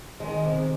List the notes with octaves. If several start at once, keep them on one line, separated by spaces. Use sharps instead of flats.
D#3 G#3
C3